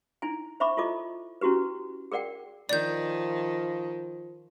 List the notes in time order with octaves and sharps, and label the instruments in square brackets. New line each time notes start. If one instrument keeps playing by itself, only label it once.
[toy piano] D#4 E4 G#5
C5 E5 B5 C#6 D6
E4 F4 A4 D#5 D6
C#4 E4 F#4 G4 B4
G#4 A#4 D5 F#5 G5
[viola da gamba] D#3 [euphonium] F3 [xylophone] D5 G6